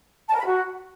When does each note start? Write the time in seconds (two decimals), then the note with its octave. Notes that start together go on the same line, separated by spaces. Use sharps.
0.29 A5
0.34 A#4
0.40 B5
0.46 F#4